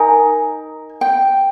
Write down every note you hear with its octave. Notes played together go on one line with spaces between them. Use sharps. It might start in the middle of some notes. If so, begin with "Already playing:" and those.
Already playing: D#4 A#4 G#5
G5